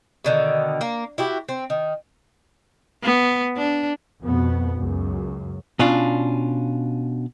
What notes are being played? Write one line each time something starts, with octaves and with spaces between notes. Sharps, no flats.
B2 D3 D#3
A#3
E4 F#4 G4
C4
D#3
B3
D4
F2 B2 B3
C#2 F#2
B2 C#4 D4 F4